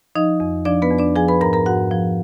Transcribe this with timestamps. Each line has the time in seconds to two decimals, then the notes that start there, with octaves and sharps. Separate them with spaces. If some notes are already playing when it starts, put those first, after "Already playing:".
0.15 F3 D#4 D#5
0.40 F2
0.65 F3 D4 D5
0.82 B3 B4
0.90 F2
0.98 D4 D5
1.16 F3 G#4 G#5
1.28 B4 B5
1.41 G#2 A#4 A#5
1.53 A#4 A#5
1.66 G#2 F#4 F#5
1.91 F3